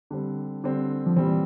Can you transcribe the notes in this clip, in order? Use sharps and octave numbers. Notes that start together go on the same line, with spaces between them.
D3 G3 C4
D3 G3 C4
F3
A#2 E3 G3 C4